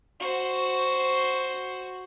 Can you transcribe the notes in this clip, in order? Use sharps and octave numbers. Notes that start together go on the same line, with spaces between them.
F#4 C5